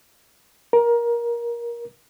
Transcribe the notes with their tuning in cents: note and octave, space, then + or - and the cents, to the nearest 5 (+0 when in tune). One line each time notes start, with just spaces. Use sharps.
A#4 +20